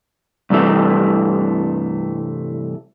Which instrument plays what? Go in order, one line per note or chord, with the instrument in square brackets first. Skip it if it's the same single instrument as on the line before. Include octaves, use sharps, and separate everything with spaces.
[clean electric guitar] C2 G2 C3 E3 A3